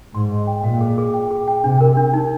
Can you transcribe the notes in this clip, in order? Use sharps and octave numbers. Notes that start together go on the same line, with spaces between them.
G#2 C6
D#5
G5
A#2 F5
G#4
G#4
G5
G#4
G5
C3 D4
A#4
D4
D#4